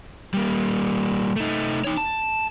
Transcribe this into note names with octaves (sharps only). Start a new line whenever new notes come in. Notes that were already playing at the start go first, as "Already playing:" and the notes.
G3 A#3
A3 D#4
D#4 C#5
A5